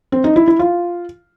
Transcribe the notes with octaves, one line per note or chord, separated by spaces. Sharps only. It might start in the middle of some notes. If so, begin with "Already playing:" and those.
C4
D#4
E4
E4
F4